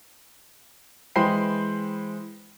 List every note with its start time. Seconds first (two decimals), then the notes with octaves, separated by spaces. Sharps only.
1.16 E3 G#3 C5 G5 B5 C7